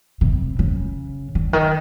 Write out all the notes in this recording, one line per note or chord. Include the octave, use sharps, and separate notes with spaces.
C3
C#3
D3
D#3